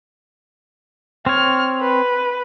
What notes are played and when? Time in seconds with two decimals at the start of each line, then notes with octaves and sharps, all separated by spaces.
1.26 C4 C#5 F6
1.81 B4